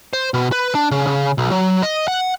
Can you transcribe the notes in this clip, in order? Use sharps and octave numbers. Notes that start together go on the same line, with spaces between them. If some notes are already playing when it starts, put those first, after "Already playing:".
C5
B2
B4
D4
C#3
C#3
B1
F#3
D#5
F#5